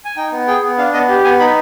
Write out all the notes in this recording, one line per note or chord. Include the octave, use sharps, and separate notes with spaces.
G#5
D#4 G5
B3
G#4 G5
B3
D4 F5
B3 D#5
G4
B3 G#5
D#4 B5